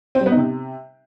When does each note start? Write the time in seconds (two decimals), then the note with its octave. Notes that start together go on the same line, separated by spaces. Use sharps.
0.15 C4
0.21 G3
0.26 B3
0.31 D#4
0.37 C3